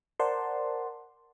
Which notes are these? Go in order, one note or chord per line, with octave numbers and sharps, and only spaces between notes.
A#4 C5 D5 F#5 A5 C6